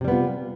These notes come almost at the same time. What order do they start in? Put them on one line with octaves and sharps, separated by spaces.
C3 G3 B3 F4